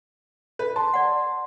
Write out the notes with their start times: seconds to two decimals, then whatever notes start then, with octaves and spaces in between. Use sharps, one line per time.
0.59 B4
0.76 A5 C6
0.94 D5 F#5